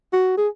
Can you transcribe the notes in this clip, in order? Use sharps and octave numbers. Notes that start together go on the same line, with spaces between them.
F#4
G#4